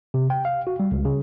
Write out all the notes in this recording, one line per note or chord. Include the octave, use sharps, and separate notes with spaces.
C3
G5
F5
F#4
G3
C#2
C#3